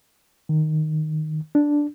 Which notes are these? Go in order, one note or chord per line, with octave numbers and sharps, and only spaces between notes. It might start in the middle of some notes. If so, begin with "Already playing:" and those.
D#3
D4